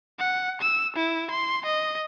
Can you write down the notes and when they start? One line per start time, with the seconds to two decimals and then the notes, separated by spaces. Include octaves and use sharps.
0.19 F#5
0.61 E6
0.96 E4
1.31 C6
1.65 D#5